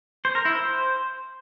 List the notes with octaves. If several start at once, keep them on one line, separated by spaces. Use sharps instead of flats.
C5
A#4
E4
C5